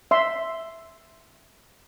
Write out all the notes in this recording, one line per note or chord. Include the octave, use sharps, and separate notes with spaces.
E5 C6